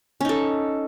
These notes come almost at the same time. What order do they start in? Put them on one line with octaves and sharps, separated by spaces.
C#4 D#4 A4